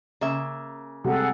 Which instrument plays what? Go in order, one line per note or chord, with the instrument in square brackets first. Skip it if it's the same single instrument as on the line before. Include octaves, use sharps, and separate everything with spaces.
[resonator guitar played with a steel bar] C#3 A#3 E5
[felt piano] C3 G3 G#3 [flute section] G#4 A4 F#5